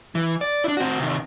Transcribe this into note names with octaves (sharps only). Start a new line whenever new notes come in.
E3
D5
D4 E4
C4 F#4
C3 D#3